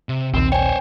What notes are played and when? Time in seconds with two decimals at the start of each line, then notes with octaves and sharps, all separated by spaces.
0.09 C3
0.34 A#1 D#2 C4
0.52 C5 C#5 G5 G#5